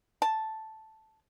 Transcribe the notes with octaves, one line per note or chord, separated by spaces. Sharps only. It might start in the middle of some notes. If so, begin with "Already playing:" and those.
A5